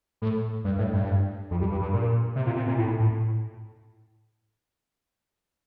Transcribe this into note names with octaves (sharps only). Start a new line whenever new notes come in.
A2
G2
A2
G2
F2
G2
G2
G2
A#2
C3
A#2
C3
A#2
A2
A2